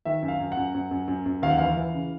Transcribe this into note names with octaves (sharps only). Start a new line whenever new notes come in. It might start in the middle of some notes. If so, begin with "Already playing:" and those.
D#3 E5
F#2
F5
F#2
F#5
F#2
F#2
F#2
F#2
F#2
D#2 F5
F#5
E3 F5
E3
C#3